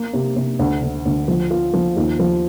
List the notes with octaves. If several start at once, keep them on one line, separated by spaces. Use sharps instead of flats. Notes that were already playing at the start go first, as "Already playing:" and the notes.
Already playing: A#3
C3
C3
D2
D3
D2
F3
F4
F3
D#2
F3